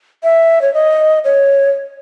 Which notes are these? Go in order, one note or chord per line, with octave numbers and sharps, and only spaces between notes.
E5
C#5
D#5
C#5